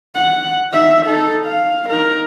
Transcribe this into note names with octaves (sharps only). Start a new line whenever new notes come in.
F#5
D#4 E5
D#4 A4
F5
D#4 A#4